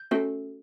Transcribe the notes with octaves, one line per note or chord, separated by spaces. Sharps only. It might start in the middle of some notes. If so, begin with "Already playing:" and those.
Already playing: G6
A3 C#4 F#4 A4